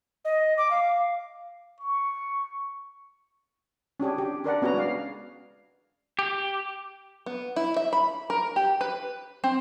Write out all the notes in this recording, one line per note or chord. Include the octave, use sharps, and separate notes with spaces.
D#5
D6
F5
C#6
C#4 D4 G4 G#4
G4
D4 A#4 D5 F#5
B3 C#4 F#4 G#4 A#5
G#3 D5 F5
G4
B3
E4
E5
B5
A#4
G4
B4
C4